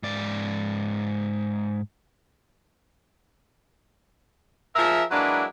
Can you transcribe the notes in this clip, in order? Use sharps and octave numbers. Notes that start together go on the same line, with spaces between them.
G#2 D5
F3 G#4 A#4 E5
F#3 G#3 A#3 D4 E4 B4